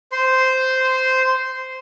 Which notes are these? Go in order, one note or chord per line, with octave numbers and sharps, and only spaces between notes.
C5 C6